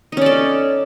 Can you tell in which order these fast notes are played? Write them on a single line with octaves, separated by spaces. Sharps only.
D#4 C#4 D5 A4